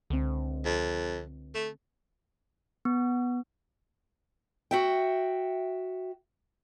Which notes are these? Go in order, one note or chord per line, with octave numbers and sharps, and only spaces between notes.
C#2 D3 C4
F2
A3
B3
F#4 E5 G5